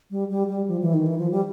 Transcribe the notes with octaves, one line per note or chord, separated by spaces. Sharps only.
G3
G3
G3
F3
E3
D#3
E3
F3
G3